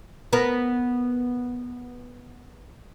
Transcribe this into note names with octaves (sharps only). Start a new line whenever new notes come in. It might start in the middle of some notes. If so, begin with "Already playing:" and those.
B3 A#4